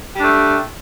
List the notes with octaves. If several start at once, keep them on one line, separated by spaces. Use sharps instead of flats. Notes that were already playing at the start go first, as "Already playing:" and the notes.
G3 A3 D4